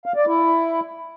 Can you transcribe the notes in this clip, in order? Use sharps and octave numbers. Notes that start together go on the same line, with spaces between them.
F5
D5
E4